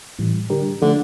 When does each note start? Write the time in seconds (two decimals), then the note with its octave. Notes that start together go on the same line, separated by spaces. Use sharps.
0.19 A2 E3 G3
0.50 D3 G3 D4 G4 A#4
0.81 D3 F3 A3 D4